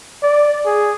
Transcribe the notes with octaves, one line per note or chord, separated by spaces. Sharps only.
D5
G#4